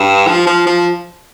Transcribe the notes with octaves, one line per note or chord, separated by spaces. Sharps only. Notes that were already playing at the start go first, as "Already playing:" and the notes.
Already playing: G2
F3
F3
F3